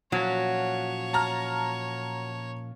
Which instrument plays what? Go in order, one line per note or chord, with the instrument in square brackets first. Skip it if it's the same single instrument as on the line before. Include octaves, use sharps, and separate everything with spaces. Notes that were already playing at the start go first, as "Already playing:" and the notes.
[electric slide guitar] A#2 F3 C#4 [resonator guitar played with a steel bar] F#3 [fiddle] C#5
[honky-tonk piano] A5 A#5 F6